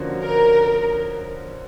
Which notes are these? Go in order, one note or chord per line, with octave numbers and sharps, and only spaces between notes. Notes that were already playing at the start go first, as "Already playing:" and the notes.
Already playing: D3 F3 A#3 C#4 F#4
A#4